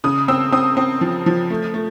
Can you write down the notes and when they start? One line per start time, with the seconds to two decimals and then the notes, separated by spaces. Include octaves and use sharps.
0.04 C#3 D#6
0.28 C4 E6
0.52 C4 D#6
0.77 C4
1.01 F3
1.26 F3
1.50 A3
1.74 A3